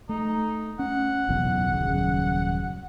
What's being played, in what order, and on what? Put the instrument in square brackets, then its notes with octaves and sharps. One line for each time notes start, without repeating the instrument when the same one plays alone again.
[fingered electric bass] A3 [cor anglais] D#4
[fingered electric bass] C#4 [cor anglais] F#5
[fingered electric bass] F#1 B1 E2
D#1 F#2 C#3